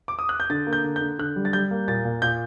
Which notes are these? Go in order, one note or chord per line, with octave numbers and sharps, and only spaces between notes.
D6
D#6
F#6
G6
D3 A6
A#3
G6
D3
G6
D3
D3 F#6
G3
A6
G3 G6
A#3
A#2 A6
A#2
A#2 G6